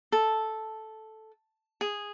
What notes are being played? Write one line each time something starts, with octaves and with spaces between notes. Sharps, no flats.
A4
G#4